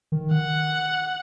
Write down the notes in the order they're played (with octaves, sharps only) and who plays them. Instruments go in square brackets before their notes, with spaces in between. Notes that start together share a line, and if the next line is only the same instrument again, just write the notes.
[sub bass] D#3
[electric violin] F#5